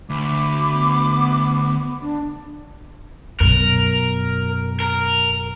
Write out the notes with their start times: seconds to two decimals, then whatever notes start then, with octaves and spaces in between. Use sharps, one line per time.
0.10 D2 B5 D6
0.71 B3
2.01 D4
3.40 F#2 B2 A#4
4.80 A#4